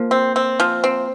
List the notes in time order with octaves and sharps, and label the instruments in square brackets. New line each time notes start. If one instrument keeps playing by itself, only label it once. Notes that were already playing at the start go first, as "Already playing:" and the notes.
Already playing: [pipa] F3 [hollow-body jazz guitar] A#3
[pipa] C4
C4
F3
C4